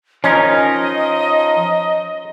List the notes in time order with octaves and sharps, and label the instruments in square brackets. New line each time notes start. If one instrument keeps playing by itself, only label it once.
[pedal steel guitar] F3 D#4 A#4 [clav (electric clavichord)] C#4 [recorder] D#5